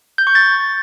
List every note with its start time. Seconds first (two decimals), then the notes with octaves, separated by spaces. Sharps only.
0.18 G6
0.27 C#6
0.35 A6